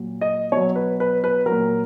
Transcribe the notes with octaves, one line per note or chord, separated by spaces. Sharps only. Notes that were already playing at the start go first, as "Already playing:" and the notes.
Already playing: A#2 F#3
D#5
B2 F#3 C#5
B4
B4
B4
F#3 A#4
A#2